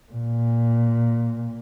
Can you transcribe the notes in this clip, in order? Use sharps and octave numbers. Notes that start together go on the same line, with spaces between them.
A#2